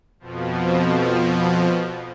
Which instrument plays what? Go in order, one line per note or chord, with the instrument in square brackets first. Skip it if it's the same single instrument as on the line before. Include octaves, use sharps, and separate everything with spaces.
[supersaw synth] F2 B2 F3